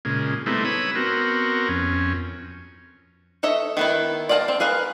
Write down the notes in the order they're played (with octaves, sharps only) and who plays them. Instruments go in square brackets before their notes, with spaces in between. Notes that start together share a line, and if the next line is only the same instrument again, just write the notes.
[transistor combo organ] A#2 C#3 G#3
G3 A3 B3 C4 D#4 E4
B4 C#5 B5 D#6 E6
B3 C4 F#4 A#4
F2 C#4
[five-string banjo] A4 C#5 D#5 E5
D#3 B3 E4
D5 D#5 F5 G5 A5
C4
G#4 A#4 B4 F5